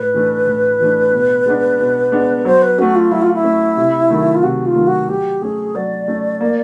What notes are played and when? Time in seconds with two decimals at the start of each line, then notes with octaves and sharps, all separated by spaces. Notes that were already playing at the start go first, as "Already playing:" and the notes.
Already playing: A2 B4
0.14 E3 A3 D4
0.47 A2
0.80 E3 A3 D4
1.13 B2
1.46 G#3 B3 D4
1.79 B2
2.12 G#3 B3 D4
2.45 F#3 C5
2.62 B4
2.78 A3 C#4 F#4
2.95 F4
3.11 F#3 E4
3.22 F4
3.34 E4
3.44 A3 C#4
3.77 C3
4.10 D#3 F#3 A3
4.34 F4
4.43 C3 F#4
4.66 F4
4.76 D#3 F#3 A3
4.87 F#4
5.08 F#3 G4
5.42 A3 C#4 G#4
5.75 F#3 D5
6.08 A3 C#4
6.41 A#3